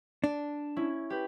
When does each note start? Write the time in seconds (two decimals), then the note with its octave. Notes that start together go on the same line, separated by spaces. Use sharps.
0.24 D4
0.77 C#4 E4
1.10 G4 B4